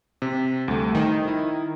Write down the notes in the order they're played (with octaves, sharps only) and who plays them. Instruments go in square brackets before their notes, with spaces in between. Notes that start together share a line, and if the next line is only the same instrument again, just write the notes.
[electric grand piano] C3
D2 G3 A3
[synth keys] D#3 [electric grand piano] C5 G5
[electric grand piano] E4